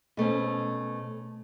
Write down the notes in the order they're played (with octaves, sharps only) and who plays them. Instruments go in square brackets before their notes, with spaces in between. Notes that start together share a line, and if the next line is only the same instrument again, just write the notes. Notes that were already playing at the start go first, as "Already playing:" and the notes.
[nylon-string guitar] B2 A3 C4 C#4